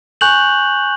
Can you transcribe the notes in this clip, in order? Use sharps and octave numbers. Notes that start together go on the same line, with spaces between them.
G#5 C#6 F#6 G6 F7 F#7